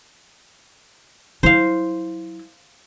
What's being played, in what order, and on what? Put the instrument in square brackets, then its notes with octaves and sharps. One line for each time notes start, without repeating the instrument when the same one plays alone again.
[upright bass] F#3 E4 [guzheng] C5 F5